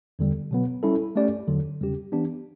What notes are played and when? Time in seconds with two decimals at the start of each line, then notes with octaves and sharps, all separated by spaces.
0.19 E2 D3 G3
0.51 B2 F#3 B3
0.83 G3 C#4 E4 A4
1.16 A3 C#4 G4 D5
1.48 E2 D3 F#3
1.81 E2 C#3 G3 C#4 G4
2.12 E3 B3 D4 G4